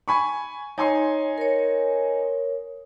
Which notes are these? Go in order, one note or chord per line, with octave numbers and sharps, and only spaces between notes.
G#5 B5 C#6
D#4 C#5 G#5 C6
A#4 C#5